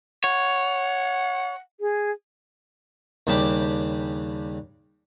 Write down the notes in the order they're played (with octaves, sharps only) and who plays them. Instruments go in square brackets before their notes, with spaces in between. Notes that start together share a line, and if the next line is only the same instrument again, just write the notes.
[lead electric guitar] C#5 [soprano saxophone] F#5
[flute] G#4
[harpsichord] D#2 C#3 G3 D4 G4 D6